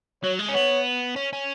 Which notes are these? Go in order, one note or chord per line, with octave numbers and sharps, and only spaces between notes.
F#3 C#5
G#3
C#4
B3 C#5
C#4
C#4